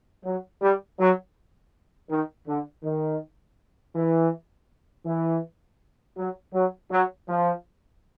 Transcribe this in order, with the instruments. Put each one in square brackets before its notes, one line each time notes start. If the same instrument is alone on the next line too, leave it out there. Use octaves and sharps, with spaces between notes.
[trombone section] F#3
G3
F#3
D#3
D3
D#3
E3
E3
F#3
F#3
F#3
F3